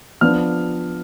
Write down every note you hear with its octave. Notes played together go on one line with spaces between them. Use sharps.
F3 B3 D4 F6